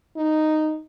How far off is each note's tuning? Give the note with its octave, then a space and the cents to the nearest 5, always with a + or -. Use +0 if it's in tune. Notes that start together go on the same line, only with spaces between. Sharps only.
D#4 -5